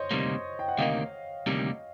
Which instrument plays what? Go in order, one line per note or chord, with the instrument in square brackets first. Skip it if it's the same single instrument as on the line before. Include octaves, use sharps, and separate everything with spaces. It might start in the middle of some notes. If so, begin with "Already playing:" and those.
Already playing: [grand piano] C5 C#5 D#5
[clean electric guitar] D2 C3 D#3 G3 A#3
[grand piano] G5
F#5
[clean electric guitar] D2 C3 D#3 G3 A#3 [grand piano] D#5 F5
[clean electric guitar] D2 C3 D#3 G3 A#3